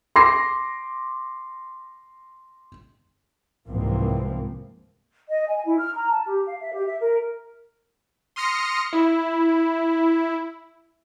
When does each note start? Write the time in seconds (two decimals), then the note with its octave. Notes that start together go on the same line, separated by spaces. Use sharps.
0.16 C6 D6 A#6 C7
3.67 C2 G#2 E3 F3 A#3 C4
5.29 D#5
5.49 G#5
5.65 E4
5.78 F6
5.94 A#5
6.10 A5
6.27 G4
6.47 F5
6.61 E5
6.73 G4
6.87 E5
7.01 A#4
8.36 C6 D#6 F6 A#6 C#7
8.93 E4